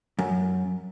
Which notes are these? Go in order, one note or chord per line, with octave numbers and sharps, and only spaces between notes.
F#2